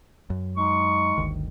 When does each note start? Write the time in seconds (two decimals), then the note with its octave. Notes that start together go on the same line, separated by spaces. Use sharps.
0.30 F#2
0.56 G#3 D#4 C#6
1.18 G1 D2 D#3